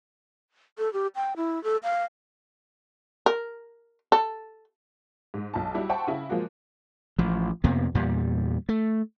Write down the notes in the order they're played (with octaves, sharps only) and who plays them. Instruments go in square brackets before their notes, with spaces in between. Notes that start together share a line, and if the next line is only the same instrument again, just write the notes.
[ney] A4
G4
G5
E4
A4
F5
[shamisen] A#4
A4
[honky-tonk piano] G#2
B1 A5
G3 E4 F#4
C5 E5 F#5 G5 A5 C#6
C#3 E4
F3 G#3 A#3 F#4
[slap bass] A1 F3
F2 C3 A#3 B3
E2 A#2 G3
A3